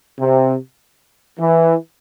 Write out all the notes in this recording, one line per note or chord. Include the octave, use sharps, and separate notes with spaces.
C3
E3